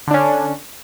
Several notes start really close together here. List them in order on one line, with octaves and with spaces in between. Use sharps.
D3 D4 C#4